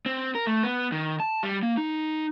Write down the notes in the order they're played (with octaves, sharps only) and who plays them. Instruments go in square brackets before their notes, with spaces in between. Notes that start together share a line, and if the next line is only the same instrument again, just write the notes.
[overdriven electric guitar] C4
A#4
A3
B3
D#3
A5
G3
A#3
D#4